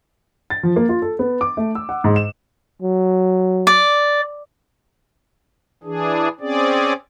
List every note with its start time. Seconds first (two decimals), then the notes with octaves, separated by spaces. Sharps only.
0.50 A6
0.63 F3
0.76 A#3
0.89 F4
1.02 A4
1.19 B3
1.41 D6
1.57 A3
1.75 E6
1.89 F#5
2.04 G#2
2.16 E7
2.82 F#3
3.67 D5
5.84 E3 D4 G#4
6.40 C4 C#4 G#4 D5